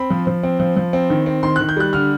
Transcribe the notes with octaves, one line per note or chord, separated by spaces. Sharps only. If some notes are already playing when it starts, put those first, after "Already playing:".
Already playing: C4 B5
F3
F3
C4
F3
F3
C4
D#3
C4
D#3 C6
D#3 F#6
G6
G3 F#6
D3 F6